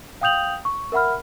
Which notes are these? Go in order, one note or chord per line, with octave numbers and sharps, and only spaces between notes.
F5 G5 D#6 G6 F7 F#7
C#6
A#4 E5 F#5 B5 F6